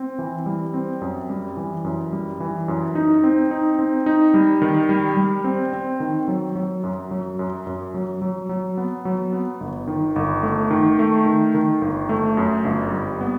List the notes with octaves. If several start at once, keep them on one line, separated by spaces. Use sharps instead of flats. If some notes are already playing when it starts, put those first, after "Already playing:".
Already playing: C4
E3
G3
C4
F#2
G3
E3
F#2
G3
E3
F#2
D#4
C4
D#4
C4
D#4
G3
D#3
G3
G3
C4
C4
D#3
F#3
F#3
F#2
F#3
F#2
F#2
F#3
F#3
F#3
B3
F#3
B3
G1
D#3
G1
A3
D#3
A3
D#3
D#3
G1
A3
F#2
G1
G3
B3